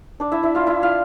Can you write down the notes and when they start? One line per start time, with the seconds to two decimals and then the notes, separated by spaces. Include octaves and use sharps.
0.20 D4 D5
0.32 E4 E5
0.43 E4 E5
0.55 F4 F5
0.67 E4 E5
0.82 F4 F5